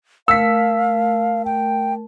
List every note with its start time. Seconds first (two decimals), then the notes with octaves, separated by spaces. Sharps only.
0.28 A3 A#4 F5 A5 E6 B6
1.45 G5